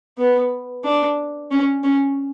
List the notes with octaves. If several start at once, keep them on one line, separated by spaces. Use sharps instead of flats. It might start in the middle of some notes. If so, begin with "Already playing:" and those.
B3
D4
C#4
C#4